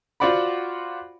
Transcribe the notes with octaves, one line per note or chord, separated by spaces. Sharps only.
F4 F#4 C5 D5 F#5 B5